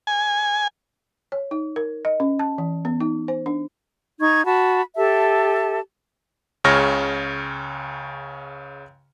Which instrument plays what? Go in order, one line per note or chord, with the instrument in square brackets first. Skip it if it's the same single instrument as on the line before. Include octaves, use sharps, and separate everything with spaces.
[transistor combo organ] G#5
[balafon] C#5
D#4
A#4
D#5
C#4
A5
E3
B3
D#4
C5
D4
[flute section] D#4 C#6 G#6
F#4 A5 B5
G4 A4 E5 A5
[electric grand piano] C#2 C#3 C#5 F6 A#6